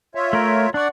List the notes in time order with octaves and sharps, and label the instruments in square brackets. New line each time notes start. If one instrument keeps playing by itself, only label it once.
[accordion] F4 C#5 E5
[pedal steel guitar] A3 A#4
[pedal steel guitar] D4 C#6 [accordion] D5 F#5